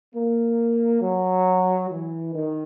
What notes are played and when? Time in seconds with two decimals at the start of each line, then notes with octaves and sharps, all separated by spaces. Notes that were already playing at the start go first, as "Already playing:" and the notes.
0.13 A#3
1.01 F#3
1.89 E3
2.33 D#3